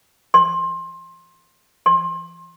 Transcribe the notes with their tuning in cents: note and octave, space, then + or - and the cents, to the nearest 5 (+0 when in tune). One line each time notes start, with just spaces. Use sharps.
C6 +20
C6 +25